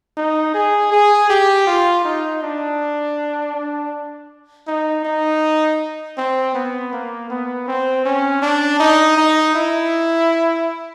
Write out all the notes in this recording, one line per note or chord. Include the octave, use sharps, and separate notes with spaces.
D#4
G#4
G#4
G4
F4
D#4
D4
D4
D#4
D#4
C4
B3
A#3
B3
C4
C#4
D4
D#4
D#4
E4